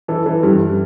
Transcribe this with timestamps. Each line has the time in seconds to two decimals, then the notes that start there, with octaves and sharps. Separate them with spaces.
0.08 E3 A4
0.26 E3
0.43 G2